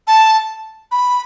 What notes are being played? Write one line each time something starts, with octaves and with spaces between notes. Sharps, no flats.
A5
B5